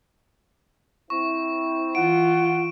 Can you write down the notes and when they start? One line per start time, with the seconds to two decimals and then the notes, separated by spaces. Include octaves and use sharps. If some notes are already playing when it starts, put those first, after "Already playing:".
1.10 C4 E4 C#6
1.95 E3 F4 F#5 D7